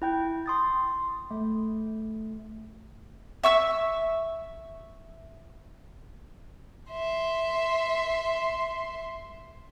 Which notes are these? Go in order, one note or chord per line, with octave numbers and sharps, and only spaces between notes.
E4 G5 G6
C6 D#6 A6
A3
E5 C#6 E6
E5 C6